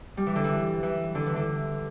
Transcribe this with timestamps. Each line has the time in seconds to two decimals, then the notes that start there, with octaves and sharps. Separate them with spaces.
0.17 G3
0.27 E3
0.36 D3
0.44 E3
0.83 E3
1.15 D3
1.26 E3
1.36 D3